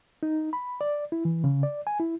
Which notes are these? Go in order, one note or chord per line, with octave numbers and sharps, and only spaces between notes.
D#4
B5
D5
E4
E3
C#3
D5
G#5
E4